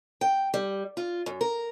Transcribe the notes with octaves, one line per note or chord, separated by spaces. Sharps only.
G5
G3
F4
F#2
A#4